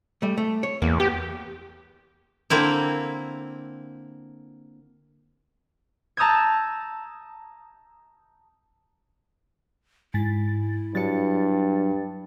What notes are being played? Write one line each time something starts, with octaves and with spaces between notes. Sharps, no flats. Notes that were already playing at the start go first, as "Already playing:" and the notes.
G3 A3
A3
C#5
E2 A#3
B3 G4
D3 A#3 C4 E4
A5 A#5 D#6 E6 G6 G#6
G#2 E4 A6
G2 F#3 D4 A6 C#7